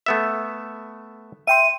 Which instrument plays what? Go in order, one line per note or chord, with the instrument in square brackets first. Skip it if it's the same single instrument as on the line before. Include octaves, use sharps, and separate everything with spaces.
[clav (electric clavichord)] A3 B3 E5
[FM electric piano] E5 G5 C6 [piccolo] D#7